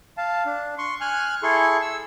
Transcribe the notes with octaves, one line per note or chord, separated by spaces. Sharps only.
F5 A5
D4
C6 C#6
G#5 F6 F#6
E4 G#4 A4 C6 C#6
E6